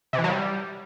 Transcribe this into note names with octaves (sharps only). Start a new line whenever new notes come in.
C3
E3
F#3
G3